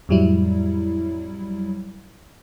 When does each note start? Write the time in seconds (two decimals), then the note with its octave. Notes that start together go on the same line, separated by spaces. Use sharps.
0.09 F2 A2 F#3 G3 E4